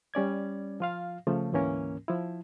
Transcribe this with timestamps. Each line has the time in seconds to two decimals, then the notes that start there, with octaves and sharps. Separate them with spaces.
0.14 G3 C#4 D5 G#6
0.80 F3 F4 F5
1.27 C#3 F3 A3 C#4
1.52 D2 G#2 E3 A#3 C#4 A#4
2.08 F3 E4